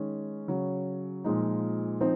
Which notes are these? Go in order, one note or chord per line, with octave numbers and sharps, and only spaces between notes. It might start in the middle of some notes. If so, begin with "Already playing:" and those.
Already playing: D#3 G#3 C#4
C#3 F#3 C#4
A#2 F3 G#3 D#4
F3 C4 D#4